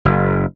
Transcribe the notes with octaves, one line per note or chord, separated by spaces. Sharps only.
F#1